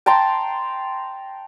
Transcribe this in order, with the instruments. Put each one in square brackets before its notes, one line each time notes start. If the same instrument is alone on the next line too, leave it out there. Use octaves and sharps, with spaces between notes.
[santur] G5 A5 A#5 C6